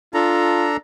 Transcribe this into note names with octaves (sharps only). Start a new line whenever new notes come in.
D4 F4 A4 A#5